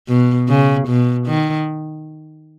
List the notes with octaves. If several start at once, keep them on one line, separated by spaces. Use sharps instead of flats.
B2
C#3
B2
D#3